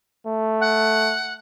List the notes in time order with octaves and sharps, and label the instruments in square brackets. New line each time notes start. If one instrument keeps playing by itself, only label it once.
[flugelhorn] A3
[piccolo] F#5